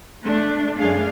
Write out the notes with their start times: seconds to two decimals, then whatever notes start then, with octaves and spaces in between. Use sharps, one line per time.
0.25 A3 D4
0.78 F#2 A3 D4 G#4 F5